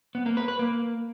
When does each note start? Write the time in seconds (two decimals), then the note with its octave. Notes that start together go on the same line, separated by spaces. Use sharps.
0.15 B3
0.26 A#3
0.37 B4
0.48 B4
0.59 A#3